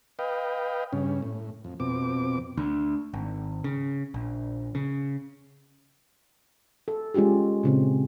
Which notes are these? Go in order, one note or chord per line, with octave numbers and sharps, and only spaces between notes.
B4 D#5 F5 G5
G2 C#3 C#4
A2
F2
F2 B2 C4 D6
D2
G#1
C#3
A#1
C#3
A4
G#3 C#4 F4 G4 G#4
A#2 C#3 C4